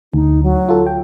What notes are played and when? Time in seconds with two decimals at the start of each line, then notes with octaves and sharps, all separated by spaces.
0.14 D2 D#4
0.43 F#3
0.69 F4 A4
0.87 G5